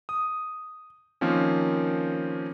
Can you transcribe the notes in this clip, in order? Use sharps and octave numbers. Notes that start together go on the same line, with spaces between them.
D#6
D#3 F3 A#3 C4 C#4